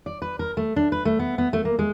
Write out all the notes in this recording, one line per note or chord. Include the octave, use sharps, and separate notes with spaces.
D5
B4
A#4
A3
D4
B4
A3
B3
B3
A3
A#3
G#3